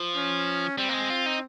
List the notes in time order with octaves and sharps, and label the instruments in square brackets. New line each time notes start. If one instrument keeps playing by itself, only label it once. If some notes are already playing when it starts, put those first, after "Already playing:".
Already playing: [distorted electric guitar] F3
[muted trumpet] C#4
[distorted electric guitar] G3 [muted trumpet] C4
[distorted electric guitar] A#3
G#3
F4
D#4